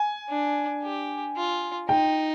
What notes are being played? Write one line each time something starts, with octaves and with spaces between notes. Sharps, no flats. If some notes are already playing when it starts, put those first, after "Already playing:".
Already playing: G#5
D4
G4
F4
D#4 G5